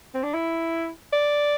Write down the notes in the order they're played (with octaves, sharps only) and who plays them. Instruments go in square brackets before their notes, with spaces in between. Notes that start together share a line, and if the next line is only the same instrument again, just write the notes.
[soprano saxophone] C4
D4
E4
D5